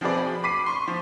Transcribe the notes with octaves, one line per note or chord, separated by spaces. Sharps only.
F3 C4 F#4 G#4 B4 D5
B5
B5 D6 B6 C7 D#7
C6 C#6
F3